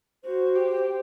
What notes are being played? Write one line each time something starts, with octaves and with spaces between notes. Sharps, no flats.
F#4 C5
G4